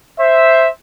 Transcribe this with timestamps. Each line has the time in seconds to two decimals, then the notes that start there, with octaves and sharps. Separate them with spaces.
0.19 C5 E5